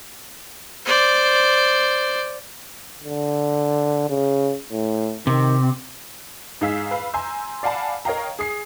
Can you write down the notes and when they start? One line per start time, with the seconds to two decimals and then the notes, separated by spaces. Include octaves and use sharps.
0.86 C5 D5
3.04 D3
4.10 C#3
4.72 A2
5.27 C3 D#3
6.61 G#2 D#4 G#4 F5 E6 B6
6.91 B4 F5
7.14 G#5 A#5 C6 E6 G6
7.63 D5 F5 F#5 G#5 A5 B5
8.05 A#4 C#5 D#5 F5 G5 A#5
8.39 G#4 D#6 C7